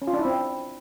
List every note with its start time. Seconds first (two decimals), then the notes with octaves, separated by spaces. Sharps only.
0.02 C#4
0.07 F4
0.13 D4
0.19 E4
0.25 C4